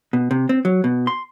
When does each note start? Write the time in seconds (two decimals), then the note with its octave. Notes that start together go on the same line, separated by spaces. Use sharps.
0.13 B2
0.31 C3
0.49 C4
0.65 F#3
0.84 B2
1.07 C6